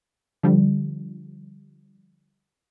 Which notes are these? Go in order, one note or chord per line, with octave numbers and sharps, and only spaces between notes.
D3 F3 G3